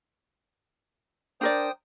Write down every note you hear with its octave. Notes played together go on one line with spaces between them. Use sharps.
D4 A#4 C5 D5 G5 D#6